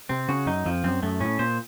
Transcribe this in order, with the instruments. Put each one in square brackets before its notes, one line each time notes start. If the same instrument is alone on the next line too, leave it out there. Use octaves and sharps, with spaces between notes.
[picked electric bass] C3 [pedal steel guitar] C4
[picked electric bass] C#3 [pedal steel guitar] F#4
[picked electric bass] F#2 [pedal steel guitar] D#4
[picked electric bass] F2 [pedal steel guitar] F3
[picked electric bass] F#2 [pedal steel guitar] C4
[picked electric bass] F#2 [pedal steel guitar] A3
[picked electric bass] A2 [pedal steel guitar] C#4
[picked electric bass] A#2 [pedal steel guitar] C5